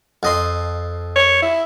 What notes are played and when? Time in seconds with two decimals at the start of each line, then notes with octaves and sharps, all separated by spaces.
0.23 F2 D#5 C6
1.16 C#5
1.42 E4